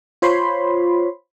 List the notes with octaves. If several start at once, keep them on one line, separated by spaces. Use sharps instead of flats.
F4 C5 C#5 B5 C6